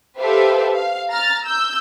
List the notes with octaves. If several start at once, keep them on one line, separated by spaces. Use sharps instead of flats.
G4 A4 B4 C5 E5 F5
F5
A#5 F6 A6
E6 G6